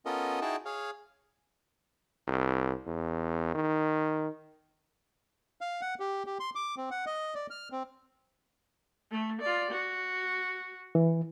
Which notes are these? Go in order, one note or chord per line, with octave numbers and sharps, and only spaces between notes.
B3 C#4 F4 A4 A#4 D#5
D#4 E4 F#4 G#4 G5 A5
G#4 C#5 F5
C2
E2
D#3
F5
F#5
G4
G4
C6
D6
C4
F#5
D#5
D5
F6
C4
A3
F4 D5
F#4
E3